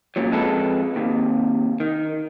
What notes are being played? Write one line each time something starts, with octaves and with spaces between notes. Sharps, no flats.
F#2 A#2 F#3
F2 G#3 A4 B4
D#2 C3
D#3